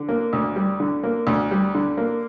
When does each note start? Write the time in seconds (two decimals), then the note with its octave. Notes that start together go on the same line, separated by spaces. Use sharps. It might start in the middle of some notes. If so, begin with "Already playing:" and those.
Already playing: D3
0.09 A#3
0.33 D2
0.56 G3
0.80 D3
1.04 A#3
1.27 D2
1.51 G3
1.75 D3
1.97 A#3